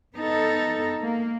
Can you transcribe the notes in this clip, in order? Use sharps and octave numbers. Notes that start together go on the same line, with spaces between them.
B3 D#4 A4
A#3